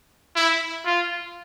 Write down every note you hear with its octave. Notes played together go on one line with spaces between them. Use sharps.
E4
F4